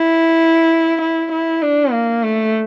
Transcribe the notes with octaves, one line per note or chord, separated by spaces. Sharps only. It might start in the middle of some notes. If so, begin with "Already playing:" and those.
Already playing: E4
E4
E4
D4
A#3
A3